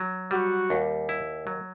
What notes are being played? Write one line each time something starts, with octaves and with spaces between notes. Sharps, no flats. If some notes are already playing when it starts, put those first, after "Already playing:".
Already playing: F#3
G3 F#4
D#2
E4
F#3